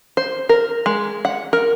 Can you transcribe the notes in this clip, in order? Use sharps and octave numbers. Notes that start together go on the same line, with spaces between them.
C5
A#4
G#3
F#5
A#4